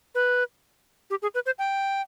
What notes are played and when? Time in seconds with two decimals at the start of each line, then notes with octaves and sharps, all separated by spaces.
0.15 B4
1.10 G4
1.22 G#4
1.34 B4
1.46 C5
1.58 G5